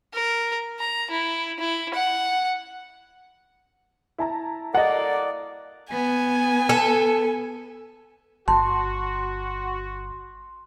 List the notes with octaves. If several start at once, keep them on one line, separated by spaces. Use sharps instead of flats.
A#4
A#5
E4
E4
F#5
E4 A5 A#5
A#3 A4 D5 D#5 F#5
B3 G#5
A4
G1 F#4 A5 C6